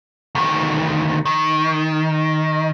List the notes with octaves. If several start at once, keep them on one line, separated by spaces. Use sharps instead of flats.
D2 D#3
D#3